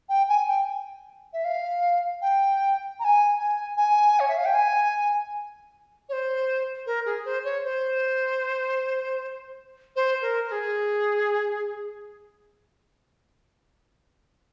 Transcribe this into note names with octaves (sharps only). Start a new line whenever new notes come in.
G5
G#5
G5
E5
F5
G5
A#5
G#5
G#5
G#5
C#5
E5
F5
G5
G#5
C#5
C5
A#4
G#4
C5
C#5
C5
C5
A#4
A#4
G#4